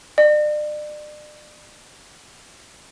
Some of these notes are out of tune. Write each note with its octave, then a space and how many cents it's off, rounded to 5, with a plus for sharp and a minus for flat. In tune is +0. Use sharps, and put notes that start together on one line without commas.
D5 +35